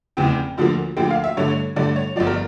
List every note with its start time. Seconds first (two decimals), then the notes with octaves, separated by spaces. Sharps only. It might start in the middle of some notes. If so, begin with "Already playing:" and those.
0.17 F1 E2 C#3 E3 G5
0.58 D2 D3 F3 A#3
0.97 D2 D3 F3 A#3 G5
1.10 F5
1.24 E5
1.37 G2 D3 A3 C#5
1.76 G2 D3 A3 D5
1.96 C#5
2.16 G1 G2 F3 D5
2.27 A#4